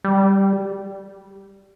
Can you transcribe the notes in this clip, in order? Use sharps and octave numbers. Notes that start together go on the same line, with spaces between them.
G3